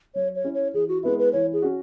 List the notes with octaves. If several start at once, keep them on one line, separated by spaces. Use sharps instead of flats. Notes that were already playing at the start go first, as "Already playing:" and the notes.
F#3 C#5
C#5
C#4 E4
C#5
E3 G#4
F#4
G#3 B3 E4 B4
B4
E3 C#5
G#4
C#4 F#4